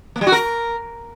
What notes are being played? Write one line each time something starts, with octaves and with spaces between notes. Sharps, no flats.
A#3
G3
F#4
A#4